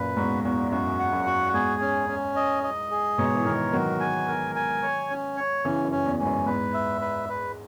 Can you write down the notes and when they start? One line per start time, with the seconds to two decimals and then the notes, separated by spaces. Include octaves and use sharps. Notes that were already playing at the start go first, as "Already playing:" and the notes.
Already playing: F#2 A#2 B4
0.17 E2 G#2 F#4
0.44 E2 F#4
0.72 F#2 F#4
0.99 F#5
1.13 F#2
1.26 F#4
1.54 E2 G#2 G#4
1.81 C#4
2.09 C#4
2.36 D#5
2.64 D#5
2.91 G#4
3.18 G#2 B2 C#5
3.35 E3
3.45 B2 D#3 A#4
3.73 D#3 F#3 F#4
4.00 G#5
4.28 A#4
4.55 G#5
4.83 C#5
5.10 C#4
5.37 C#5
5.65 C#3 E3 C#4
5.85 F#2
5.92 C#4
6.06 E2
6.19 G#2 C#4
6.26 F#2
6.46 E2 G#2 B4
6.74 E5
7.01 B4
7.29 B4